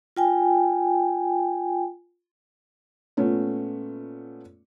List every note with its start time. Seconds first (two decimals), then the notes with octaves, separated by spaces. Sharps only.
0.17 F4 G5 G#5
3.17 A#2 A3 B3 C#4